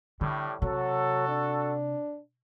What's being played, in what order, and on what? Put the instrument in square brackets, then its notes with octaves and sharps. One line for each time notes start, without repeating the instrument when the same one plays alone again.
[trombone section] A2 G3 [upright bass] D3
[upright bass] C3 [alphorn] F#3 [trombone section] F#4 A4
[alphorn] D4